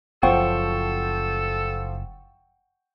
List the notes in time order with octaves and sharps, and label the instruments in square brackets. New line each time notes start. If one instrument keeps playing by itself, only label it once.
[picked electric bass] F#1 [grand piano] F3 C5 [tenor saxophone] A4 [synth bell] F#5 G5 C#6